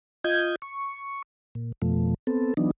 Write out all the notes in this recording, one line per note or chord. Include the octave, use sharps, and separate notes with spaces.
F4 D#5 G6 G#6
C#6
A#2
F2 B2 F3 A3
B3 C4 A4
E3 F#3 B3 D4 D#4